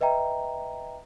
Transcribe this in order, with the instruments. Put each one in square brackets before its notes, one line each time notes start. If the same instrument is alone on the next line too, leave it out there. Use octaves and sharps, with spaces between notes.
[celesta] B4 D#5 E5 G5 A#5